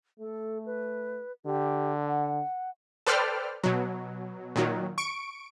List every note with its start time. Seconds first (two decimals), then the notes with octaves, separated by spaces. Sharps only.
0.19 A3 A4
0.66 B4
1.45 D3 G4
2.06 F#5
3.07 A4 B4 C5 D5 G5 F6
3.64 B2 F#3
4.56 A#2 D#3 F#3
4.98 C#6 D7